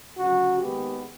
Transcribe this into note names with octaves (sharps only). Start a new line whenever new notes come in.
D2 C#3 F#3 F#4
D#2 D#3 G#3 B3 G4